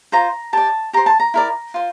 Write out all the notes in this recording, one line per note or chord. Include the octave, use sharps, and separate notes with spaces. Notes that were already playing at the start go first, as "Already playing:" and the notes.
F4 C5 A#5
G4 D5 A5
G4 C5 A#5
A5
A#5
E4 A#4 D5
F4 C5